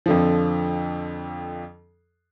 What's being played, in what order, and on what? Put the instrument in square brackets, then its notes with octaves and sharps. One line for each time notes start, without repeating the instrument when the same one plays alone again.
[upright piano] F2 D3 F3